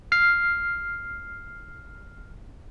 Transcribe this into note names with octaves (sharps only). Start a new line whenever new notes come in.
F6 C7